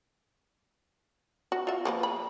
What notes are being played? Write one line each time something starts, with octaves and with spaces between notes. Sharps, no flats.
F#4
F4 E5
F3 A#3 B4
B5